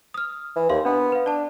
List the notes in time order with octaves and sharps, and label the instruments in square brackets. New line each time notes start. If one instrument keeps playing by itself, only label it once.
[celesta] D#6 F6
[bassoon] E3
[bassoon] D#2 [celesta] F5 C6
[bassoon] B3 [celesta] D4
[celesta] B4 F5
[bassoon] D4 [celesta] D5 A5